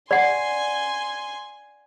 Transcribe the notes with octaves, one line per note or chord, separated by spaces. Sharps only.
D5 F#5 G#5 C6